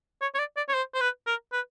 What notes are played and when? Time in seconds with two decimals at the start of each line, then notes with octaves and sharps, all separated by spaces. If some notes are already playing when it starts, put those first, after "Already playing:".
0.22 C#5
0.34 C#5
0.39 D5
0.57 D5
0.69 C#5
0.74 C5
0.94 C5
1.01 B4
1.27 A#4
1.53 B4